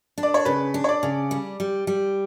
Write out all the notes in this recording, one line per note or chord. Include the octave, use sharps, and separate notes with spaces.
D4
D5
C#5
C#3 B4
D4
C#5
D5
C#3
G3
G3
G3